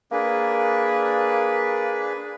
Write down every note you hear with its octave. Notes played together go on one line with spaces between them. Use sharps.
A#3 D4 G#4 B4